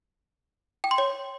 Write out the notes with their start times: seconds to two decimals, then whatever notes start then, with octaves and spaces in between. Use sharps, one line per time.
0.84 G5
0.91 C6
0.98 C#5